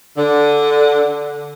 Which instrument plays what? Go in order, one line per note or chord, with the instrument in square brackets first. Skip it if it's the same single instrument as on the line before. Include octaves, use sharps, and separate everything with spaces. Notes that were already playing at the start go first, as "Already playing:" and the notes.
[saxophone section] D3